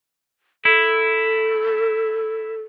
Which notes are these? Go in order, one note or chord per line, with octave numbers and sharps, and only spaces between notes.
E4 A4